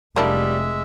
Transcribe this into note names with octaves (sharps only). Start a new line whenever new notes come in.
F1 G3 G#3 A#3 D4 E4 E5